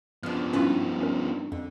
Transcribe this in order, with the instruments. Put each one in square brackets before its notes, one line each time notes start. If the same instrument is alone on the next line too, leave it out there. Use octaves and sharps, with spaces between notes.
[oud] F#2 D4 [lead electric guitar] F3 B3 [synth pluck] F6
[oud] G2 D#3 B4 [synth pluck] C#4 E4 F4
[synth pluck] C#4 A#4
[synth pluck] F2 [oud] D3